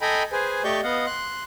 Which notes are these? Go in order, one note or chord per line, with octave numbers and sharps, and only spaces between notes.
A4 D#5 G5 G#5 A#5 B5
G#4 B4 C5 G#5
A3 G4 D5 D#5 C#6 G6
B3 D#5 F5 F#5
C6 F#6